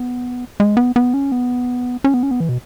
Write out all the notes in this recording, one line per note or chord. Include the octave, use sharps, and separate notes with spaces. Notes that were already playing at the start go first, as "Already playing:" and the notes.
Already playing: B3
G#3
B3
B3
C#4
B3
C#4
B3
C#4
B3
E3
B2